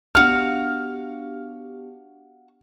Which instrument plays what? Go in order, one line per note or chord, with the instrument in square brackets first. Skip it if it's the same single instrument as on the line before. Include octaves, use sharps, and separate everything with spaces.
[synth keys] B3 D4 G4 [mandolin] F#4 F5 [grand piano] F6